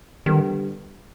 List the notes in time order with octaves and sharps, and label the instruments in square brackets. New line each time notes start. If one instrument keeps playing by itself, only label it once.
[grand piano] D3 G3 B3 [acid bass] D#3